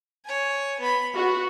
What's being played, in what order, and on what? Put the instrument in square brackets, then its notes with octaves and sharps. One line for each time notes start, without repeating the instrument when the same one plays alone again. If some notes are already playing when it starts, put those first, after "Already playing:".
[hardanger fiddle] C#5 G#5
B3 B5
[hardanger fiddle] B3 [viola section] F#4